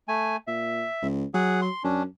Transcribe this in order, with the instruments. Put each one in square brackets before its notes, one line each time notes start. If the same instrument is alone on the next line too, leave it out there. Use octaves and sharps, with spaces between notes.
[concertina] A3 G#5
[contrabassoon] A#2 [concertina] E5
[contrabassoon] C#2
[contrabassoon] F#3 [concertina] G#4 F#5
[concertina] C6
[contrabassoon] F#2 [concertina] C#4 D4